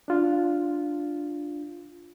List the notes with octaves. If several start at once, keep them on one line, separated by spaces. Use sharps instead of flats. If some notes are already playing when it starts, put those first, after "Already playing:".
D4 F4